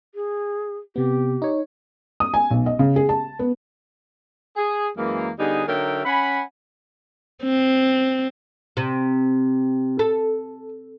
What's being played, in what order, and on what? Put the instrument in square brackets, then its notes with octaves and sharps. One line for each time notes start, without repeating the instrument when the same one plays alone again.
[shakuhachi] G#4
[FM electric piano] C3 B3 [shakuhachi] G4
[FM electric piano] D#4 C#5
[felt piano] D#6
G#5
B1
D#5
C#3
G#4
A5
B3
[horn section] G#4
F#2 E3 G#3 A#3
D3 G3 B3 D#4 G#4
D3 F#3 D#4 A#4 E5 G5
C#4 F#5 G#5 B5
[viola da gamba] C4
[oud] C3
A4